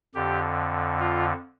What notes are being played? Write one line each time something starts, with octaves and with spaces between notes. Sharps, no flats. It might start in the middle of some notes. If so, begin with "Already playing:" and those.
F2 D3 G4
F4